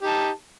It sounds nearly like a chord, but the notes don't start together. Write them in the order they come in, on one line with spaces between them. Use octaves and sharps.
G4 D#4 A5